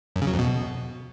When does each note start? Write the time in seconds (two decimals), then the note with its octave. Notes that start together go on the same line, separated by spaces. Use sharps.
0.16 F#2
0.21 C#3
0.27 F#3
0.33 F2
0.39 B2